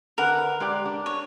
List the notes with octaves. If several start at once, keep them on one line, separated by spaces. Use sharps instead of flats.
D3 A#4 B4 F#5
G#3 G4 D5
D4
C#5